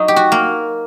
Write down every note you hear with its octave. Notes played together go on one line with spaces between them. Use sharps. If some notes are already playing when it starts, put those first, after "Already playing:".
Already playing: F#3 D#4
G4
F#4
A#3